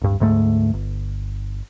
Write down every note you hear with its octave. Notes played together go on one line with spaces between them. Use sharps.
D1 G2
D2 G#2 A3
G1